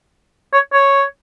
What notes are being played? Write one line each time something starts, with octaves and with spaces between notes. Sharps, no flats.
C#5
C#5